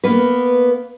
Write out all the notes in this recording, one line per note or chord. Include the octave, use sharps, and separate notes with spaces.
A#3 B3 B4